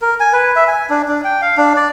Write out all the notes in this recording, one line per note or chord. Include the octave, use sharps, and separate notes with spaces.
A#4
G#5
B4
E5
G#5
D4
D4
G5
F5
D4
D5